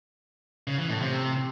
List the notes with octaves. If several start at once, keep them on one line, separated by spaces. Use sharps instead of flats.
C#3
E3
A2
C3